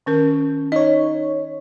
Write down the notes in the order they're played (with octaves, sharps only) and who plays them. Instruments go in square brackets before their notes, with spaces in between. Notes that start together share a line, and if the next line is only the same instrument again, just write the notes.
[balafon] D#3 C#4 A#4
[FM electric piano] D#4 C#5 [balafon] D#5